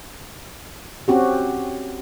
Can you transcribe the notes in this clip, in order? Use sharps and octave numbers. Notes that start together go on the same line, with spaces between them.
C4 C#4 F#4 G4